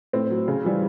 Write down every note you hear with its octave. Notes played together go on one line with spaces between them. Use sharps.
A2 C4
F#3
C#3
E3 G3